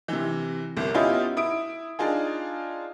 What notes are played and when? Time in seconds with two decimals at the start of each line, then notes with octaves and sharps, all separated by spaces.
0.08 C3 E3
0.77 G1 C2
0.94 B3 C#4 E4 F4 G4 D#5
1.37 E4 D#6 D7
1.99 D4 D#4 F4 G#4